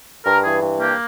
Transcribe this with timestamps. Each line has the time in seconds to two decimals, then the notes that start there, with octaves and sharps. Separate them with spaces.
0.25 G2 A#4
0.44 E3 G#4
0.61 G2
0.79 A#3 G4